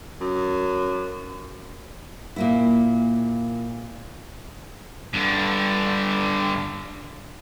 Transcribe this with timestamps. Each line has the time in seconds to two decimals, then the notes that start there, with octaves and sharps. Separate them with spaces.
0.21 F#2
2.36 A#2 A#3 E4
5.13 G2 D3